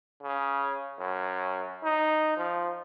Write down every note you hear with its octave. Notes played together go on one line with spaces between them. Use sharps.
C#3
F#2
D#4
F3